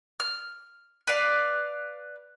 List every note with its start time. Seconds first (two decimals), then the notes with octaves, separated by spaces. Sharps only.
0.20 F6
1.07 B4 D5 F5